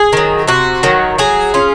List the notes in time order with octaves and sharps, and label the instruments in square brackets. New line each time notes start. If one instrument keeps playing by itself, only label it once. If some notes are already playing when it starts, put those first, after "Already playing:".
Already playing: [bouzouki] G#4
D#3 F#3
C3 F#4
D#3 F#3
F#3 G#4
C#4 F4